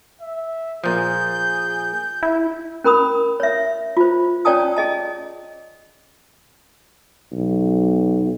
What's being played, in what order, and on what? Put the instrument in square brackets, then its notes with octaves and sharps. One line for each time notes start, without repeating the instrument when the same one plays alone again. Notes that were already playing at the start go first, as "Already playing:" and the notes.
[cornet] E5
[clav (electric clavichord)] A#2 F3 [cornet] G#4 [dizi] G6
[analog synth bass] E4 [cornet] E5
[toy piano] C#4 A#4 B5 D#6
C#5 E5
F4 C5
C#4 C#5 D5 G5 A5 D#6
G#4 D#5 A5
[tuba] B1